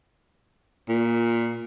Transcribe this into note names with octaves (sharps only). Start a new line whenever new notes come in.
A#2